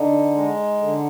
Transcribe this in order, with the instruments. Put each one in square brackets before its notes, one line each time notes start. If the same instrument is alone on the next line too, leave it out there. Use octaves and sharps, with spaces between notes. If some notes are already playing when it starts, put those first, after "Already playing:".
Already playing: [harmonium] D3 [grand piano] D#4
[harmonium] G#3
D3